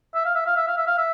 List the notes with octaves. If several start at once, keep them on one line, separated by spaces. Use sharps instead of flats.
E5
F5
E5
F5
E5
F5
E5
F5
E5